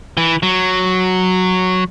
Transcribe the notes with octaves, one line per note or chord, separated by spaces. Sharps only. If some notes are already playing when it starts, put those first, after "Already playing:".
E3
F#3